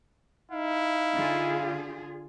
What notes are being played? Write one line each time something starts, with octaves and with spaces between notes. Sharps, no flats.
D#4 E4 F5
D3 F4 G#4